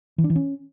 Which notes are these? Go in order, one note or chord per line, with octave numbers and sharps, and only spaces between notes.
E3
D4
E3
C#4